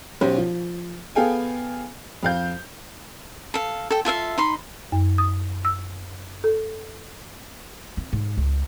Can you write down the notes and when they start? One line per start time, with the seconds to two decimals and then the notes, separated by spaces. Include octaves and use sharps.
0.21 B1 C#4 G4 C5
0.38 F3
1.15 B3 G#4 A4 F5 G5 G#5
2.23 F2 F5 G6
3.54 A4 F5
3.90 A4 G5
4.05 F4 A4 E5 F5
4.38 D#4 B5 C6
4.92 F#2
5.18 D#6
5.65 E6
6.44 A4
7.97 C4
8.13 G#2
8.37 C#2